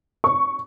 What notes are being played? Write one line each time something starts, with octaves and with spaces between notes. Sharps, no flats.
C#6